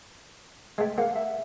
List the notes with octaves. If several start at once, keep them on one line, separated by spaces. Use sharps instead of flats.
G#3 A3 G5
A#3 F5 F#5
E5